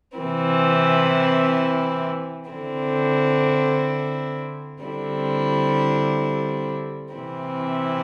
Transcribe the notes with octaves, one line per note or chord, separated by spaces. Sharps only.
C3 E3 C4 E4
D3 C4 E4
D3 G3 C4 E4
C3 E3 C4 E4